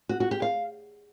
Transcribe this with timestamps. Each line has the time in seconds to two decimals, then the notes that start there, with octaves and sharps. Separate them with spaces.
0.09 F#4
0.20 F#4
0.31 G4
0.42 F5